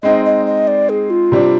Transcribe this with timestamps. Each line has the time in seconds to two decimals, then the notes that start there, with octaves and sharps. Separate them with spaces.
0.03 G#3 C4 D#4 D#5
0.25 D#5
0.46 D#5
0.67 D5
0.89 G#4
1.10 F4
1.32 C3 G3 D4